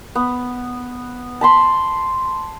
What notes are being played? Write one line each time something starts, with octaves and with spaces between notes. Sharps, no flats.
B3
A5 B5 C6